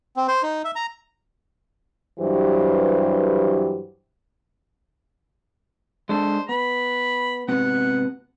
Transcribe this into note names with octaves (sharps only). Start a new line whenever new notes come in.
C4
C5
D#4
E5
A#5
G2 E3 F#3 G4 C5
G#3 D4 A4 C5
B3 B5
G#2 C3 B3 F#5